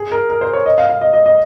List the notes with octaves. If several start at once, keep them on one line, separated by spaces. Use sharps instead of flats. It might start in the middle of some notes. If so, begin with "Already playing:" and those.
Already playing: G#4
A#4
A#4
C5
C#5
D#5
F5
F5
D#5
D#5
D#5